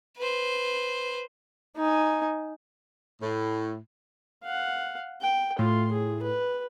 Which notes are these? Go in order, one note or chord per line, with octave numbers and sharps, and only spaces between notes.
B4 C5
D#4 G#5
A2
F5 F#5
G5
A2 F4 C6
G#4
B4